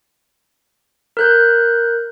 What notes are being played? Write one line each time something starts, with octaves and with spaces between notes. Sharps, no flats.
A#4 F#6 G6